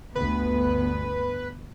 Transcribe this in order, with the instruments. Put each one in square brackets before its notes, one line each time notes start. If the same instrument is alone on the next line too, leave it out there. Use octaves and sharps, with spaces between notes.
[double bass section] G1 D2 B3 [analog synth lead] B4